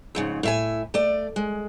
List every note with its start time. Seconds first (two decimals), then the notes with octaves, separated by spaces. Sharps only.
0.15 F2 G#2 C#3
0.43 A2 E5 G#5
0.94 A3 D5
1.36 G#3